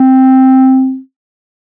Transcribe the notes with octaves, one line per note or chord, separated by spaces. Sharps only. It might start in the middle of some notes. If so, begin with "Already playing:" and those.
Already playing: C4